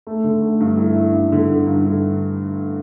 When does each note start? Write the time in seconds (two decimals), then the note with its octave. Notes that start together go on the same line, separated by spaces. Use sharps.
0.07 A3
0.24 D3
0.42 A3
0.60 G2
0.78 E4
0.95 E4
1.14 G2
1.32 D3
1.49 D3
1.67 G2
1.85 D3